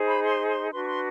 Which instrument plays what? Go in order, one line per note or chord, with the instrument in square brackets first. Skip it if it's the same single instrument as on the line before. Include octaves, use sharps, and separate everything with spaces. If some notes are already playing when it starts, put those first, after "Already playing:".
Already playing: [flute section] D#4 G#4 C5
B5
C6
C6
D4 F#4 B4 C6
C#6
C6